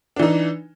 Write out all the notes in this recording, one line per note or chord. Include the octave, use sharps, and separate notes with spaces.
E3 D4 D#4